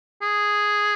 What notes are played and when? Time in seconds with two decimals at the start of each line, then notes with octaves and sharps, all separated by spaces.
0.22 G#4